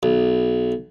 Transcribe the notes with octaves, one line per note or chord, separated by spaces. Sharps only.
B1